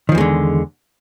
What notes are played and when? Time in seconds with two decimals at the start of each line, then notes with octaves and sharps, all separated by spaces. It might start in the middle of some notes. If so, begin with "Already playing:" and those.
0.09 D#3
0.12 F3
0.15 E2
0.18 G#3
0.21 D3